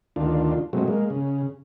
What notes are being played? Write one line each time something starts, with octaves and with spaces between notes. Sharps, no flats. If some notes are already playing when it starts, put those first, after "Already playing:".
D2 D#3 D4 F4
B2 F#3 G#3 A3 C4
G#3 A#3
C#3